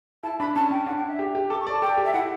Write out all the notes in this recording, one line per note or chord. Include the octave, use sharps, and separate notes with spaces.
E4 A5
D4 B5
C#4 A5
C#4 G5
D4 F#5
G5
E5
G4
G4
A4 D6
C#6
D5
A5
A4 G5
G4
E5
E4 F#5